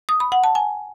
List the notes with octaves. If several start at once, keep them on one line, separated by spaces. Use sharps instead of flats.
D#6
B5
F#5
A5
G#5